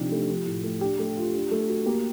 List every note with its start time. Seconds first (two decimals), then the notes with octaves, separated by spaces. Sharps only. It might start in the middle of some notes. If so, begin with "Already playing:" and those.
Already playing: C3 F3 D4 D#4 G4
0.12 A3
0.29 F3
0.46 A2
0.64 A3
0.81 D4 G4
0.99 A3
1.17 F4
1.34 D4
1.51 A3
1.69 F#4
1.86 A#3 G4